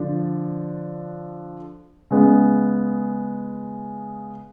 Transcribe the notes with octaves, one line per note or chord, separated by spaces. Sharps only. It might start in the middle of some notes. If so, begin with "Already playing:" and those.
Already playing: D3 F3 D4
C#3 G#3 B3